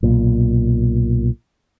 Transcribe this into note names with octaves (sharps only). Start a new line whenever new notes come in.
B1 A#2